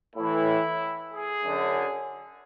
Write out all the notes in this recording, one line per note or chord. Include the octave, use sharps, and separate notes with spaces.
A2 E3 E4
G#4
F#2 D3